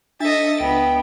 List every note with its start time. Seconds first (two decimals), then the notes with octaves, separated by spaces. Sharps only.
0.20 D4 A4 D#5 E5 A6
0.60 C#2 B3 G5